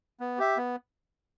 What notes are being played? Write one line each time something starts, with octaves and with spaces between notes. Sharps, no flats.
B3
G4 E5
B3